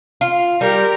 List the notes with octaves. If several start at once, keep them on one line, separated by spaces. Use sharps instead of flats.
F4
G3 G4 A#4